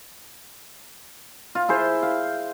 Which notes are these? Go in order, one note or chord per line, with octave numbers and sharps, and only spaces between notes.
F4
E4 G#4 C5
F5